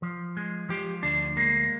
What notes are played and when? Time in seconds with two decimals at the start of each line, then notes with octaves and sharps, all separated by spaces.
0.02 F3
0.37 G#3
0.69 F3 G4
1.03 D2 D4
1.37 G#3 A#3